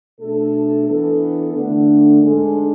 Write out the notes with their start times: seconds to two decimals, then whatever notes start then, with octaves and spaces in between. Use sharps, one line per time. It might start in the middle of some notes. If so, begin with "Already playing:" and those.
0.19 B2 A3 D4 A4
0.85 E3 B3 D4 A4
1.53 D3 A3 D4
2.21 G#2 G#3 D4 A4